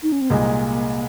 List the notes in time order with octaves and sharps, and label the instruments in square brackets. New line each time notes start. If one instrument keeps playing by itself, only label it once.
[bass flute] D#4
C#4
C4
[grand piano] C2 A#2 G#3 D#4 [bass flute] A#3